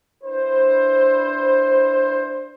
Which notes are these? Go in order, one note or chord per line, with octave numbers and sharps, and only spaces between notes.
D4 E4 B4 C5